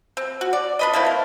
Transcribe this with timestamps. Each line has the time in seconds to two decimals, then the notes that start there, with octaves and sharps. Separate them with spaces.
0.17 C4
0.41 F#4
0.53 D5
0.79 D4 B4 D#5
0.93 A3 A#3 C4 E4
1.06 A#4